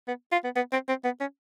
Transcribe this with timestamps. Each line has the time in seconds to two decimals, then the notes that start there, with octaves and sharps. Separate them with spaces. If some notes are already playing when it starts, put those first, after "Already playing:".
0.08 B3
0.32 F4
0.44 B3
0.56 B3
0.72 C4
0.89 C4
1.04 B3
1.21 C#4